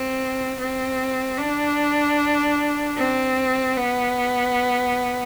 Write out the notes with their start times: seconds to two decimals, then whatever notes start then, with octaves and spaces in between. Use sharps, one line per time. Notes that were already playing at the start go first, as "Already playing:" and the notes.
Already playing: C4
0.59 C4
1.38 D4
2.97 C4
3.77 B3